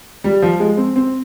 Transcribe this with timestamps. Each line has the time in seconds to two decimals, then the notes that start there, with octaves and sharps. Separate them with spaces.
0.24 G3
0.42 F3
0.60 G#3
0.77 C4
0.96 C4